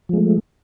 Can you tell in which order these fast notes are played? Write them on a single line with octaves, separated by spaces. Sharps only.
F3 G#3 A3